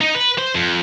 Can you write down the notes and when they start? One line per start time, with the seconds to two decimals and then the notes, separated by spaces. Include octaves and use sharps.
0.01 D#4
0.14 B4
0.38 C5
0.55 F2